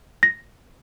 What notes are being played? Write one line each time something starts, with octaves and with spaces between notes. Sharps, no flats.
A#6